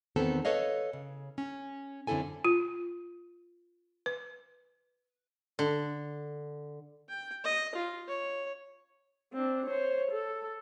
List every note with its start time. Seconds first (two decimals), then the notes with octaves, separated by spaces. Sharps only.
0.16 E2 D#3 B3 C4 A4
0.45 A4 B4 C#5 D#5 F5
0.93 C#3
1.38 C#4
2.07 F#2 D3 C4 E4 A4 G#5
2.45 F4
4.06 B4
5.59 D3
7.08 G5
7.44 D#5
7.75 F4
8.08 C#5
9.33 C4 D4
9.66 C5 C#5
10.11 A4